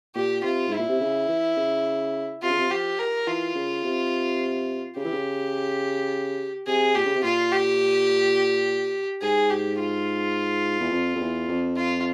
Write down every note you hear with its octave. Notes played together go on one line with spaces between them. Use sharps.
A#2 G4
C3 F4
G#2 E4
A#2
C3
C#3
E3
C#3
C3 F4
C#3
C3
F3 G4
A#4
E3 F4
C#3
C3
C#3 G4
E3
C#3
C3 G#4
A#2 G4
C#3
C3
A#2 F4
G4
G#2 G#4
G4
F4
E2
F2
F2
E2
F2
F4